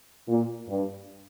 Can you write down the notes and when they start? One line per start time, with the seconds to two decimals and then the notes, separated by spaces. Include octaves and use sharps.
0.27 A#2
0.68 G2